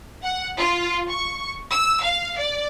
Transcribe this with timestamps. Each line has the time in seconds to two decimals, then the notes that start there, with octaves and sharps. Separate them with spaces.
0.23 F#5
0.57 F4
1.09 C#6
1.71 E6
2.02 F5
2.38 D5